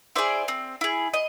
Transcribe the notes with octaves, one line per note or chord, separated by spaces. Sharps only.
E4 G#4 C5 D5
C4
E4 G#4
D#5